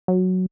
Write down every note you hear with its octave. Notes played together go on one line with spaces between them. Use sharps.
F#3